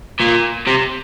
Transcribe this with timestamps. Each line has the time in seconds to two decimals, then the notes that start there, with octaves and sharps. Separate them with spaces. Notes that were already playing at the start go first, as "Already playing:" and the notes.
0.20 A#2
0.67 C3